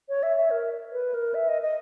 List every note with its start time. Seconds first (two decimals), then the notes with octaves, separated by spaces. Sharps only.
0.09 C#5
0.23 E5
0.37 E5
0.50 A#4
0.92 B4
1.14 A#4
1.34 E5
1.48 D#5
1.62 D#5